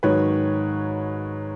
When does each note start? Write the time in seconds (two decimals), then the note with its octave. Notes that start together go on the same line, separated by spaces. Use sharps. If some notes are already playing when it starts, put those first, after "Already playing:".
0.03 G#2 D#3 F#3 B4 C#5